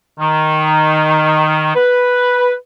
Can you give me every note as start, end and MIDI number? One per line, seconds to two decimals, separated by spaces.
0.20 1.74 51
1.76 2.53 71